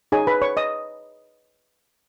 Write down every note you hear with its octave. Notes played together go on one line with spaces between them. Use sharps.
D#4 G#4 C#5 G#5
B4 B5
C#5 C#6
D#5 D#6